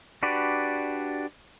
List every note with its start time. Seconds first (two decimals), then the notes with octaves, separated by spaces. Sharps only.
0.23 D4 F#4 G4 B4 D5